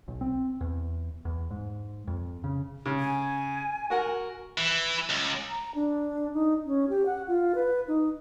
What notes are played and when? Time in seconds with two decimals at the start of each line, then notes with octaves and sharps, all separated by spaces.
0.08 B1
0.21 C4
0.61 E2
1.25 E2
1.51 G#2
2.07 F2
2.44 C#3
2.86 C#3
2.99 G#5
3.90 F#4 A#4 F#5
4.58 E3
5.09 C#2
5.49 A#5
5.75 D4
6.34 D#4
6.66 C#4
6.89 G4
7.06 F#5
7.28 F4
7.55 B4
7.87 D#4